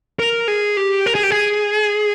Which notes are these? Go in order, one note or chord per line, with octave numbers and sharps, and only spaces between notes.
A#4
G#4
G4
A#4
G#4
G4
G#4